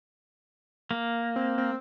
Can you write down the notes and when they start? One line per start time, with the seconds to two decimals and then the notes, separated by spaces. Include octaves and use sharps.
0.91 A#3
1.36 C4
1.58 C4